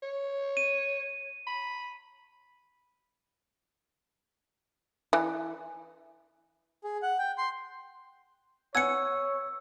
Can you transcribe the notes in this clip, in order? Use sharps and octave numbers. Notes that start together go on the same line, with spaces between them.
C#5
D#7
B5
E3
G#4
F#5
G5
C6
B4 C#5 F#5 G#5 E6 G#6 C#7